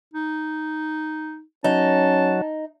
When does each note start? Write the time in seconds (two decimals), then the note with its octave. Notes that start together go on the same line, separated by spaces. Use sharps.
0.14 D#4
1.64 F#3 C#4 D#4 A5